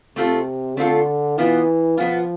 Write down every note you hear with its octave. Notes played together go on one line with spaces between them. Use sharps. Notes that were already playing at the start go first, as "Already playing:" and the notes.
C3 A3 C4 F4 A4
D3 A3 C4 F4 A4
B2 E3 B3 F4
B2 F3 B3 F4